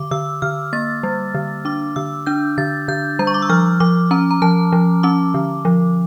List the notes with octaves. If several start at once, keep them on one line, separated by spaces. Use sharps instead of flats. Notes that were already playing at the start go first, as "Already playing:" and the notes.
Already playing: D3 D6
D3 E6
D3 F6
A#3 A6
G3
D3
D4 D6
D3 E6
D4 G6
D3 A6
D3 G6
G3 A#5
C#6
D6
E6
F3 F6
F3 D6
C#4 A#5
A#5
F3 A5
F3
C#4 D6
D3
F3